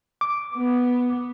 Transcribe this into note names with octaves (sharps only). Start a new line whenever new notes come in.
D6
B3